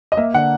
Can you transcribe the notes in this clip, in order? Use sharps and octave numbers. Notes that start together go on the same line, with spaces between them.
D#5
A#3 E5
D3 F#5